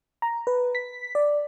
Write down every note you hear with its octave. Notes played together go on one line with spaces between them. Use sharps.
A#5
B4
B6
D5